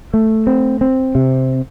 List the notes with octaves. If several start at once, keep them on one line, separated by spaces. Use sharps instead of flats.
A3
C4
C4
C3